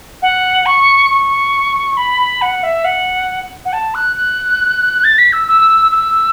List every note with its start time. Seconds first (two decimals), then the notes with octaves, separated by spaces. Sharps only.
0.22 F#5
0.66 C#6
1.10 C#6
1.97 B5
2.41 F#5
2.63 E5
2.84 F#5
3.65 F#5
3.72 A5
3.94 F#6
4.16 F#6
5.04 A6
5.18 B6
5.32 E6
5.48 E6
5.91 E6